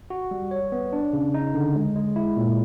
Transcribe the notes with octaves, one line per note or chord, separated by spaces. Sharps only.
F#4
G3
C#5
B3
D4
C#3
D#4
D3
G#3
G#3
E4
A#2